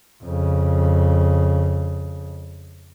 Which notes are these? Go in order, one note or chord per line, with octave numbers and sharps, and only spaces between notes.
F2 C#3